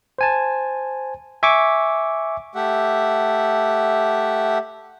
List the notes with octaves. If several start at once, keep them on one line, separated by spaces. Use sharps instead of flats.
C5 G#5 A5
E5 G#5 C#6 D6
A3 G4 E5 F#5